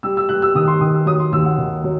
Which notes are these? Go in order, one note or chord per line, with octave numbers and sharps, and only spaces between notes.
G3 E6
E6
G3 F#6
E6
D#3 D#6
C6
D#3 D#6
E6
F#3 D#6
C6
D#2 E6
F#5
D#3
F#3